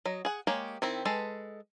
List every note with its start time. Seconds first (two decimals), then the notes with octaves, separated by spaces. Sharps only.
0.05 F#3 D#5
0.25 G#4 F#5
0.47 G#3 A#3 G4 C#5
0.82 D#3 C4 E4
1.05 G#3 A4 B4